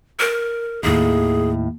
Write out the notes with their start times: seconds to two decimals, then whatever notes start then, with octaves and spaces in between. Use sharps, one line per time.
0.20 A#4
0.83 D#2 A2 G#4